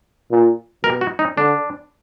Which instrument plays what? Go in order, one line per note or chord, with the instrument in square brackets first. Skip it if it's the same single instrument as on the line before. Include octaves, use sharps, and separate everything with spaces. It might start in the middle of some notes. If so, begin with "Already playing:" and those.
[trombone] A#2
[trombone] B2 [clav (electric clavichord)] A#4
[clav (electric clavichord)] F#4
D#4
[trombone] D3 [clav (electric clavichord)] D4